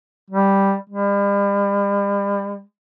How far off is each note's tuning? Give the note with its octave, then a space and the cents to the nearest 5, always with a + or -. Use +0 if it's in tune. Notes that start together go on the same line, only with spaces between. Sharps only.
G3 +0
G3 +40